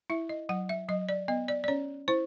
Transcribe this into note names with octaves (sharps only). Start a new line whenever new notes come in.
E4 E5
D#5
F#3 F#5
E5
F#3 D#5
D5
B3 D#5
D5
D5
C#4 C#5
E4 C5